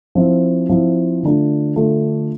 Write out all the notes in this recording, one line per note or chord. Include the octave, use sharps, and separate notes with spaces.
F3 C4 E4
F3 C4 E4
D3 A3 D4 F4
D3 A3 D4 F4